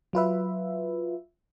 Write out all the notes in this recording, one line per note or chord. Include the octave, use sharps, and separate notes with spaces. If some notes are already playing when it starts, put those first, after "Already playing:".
F#3 F4 B4 E5